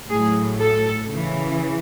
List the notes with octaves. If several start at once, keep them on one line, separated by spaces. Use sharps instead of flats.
A2 G#4
F#3
A4
C#3 E3